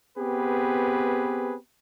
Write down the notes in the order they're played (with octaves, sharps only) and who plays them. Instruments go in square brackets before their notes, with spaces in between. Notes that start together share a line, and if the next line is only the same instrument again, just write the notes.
[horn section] B3 C4 G4 G#4 B4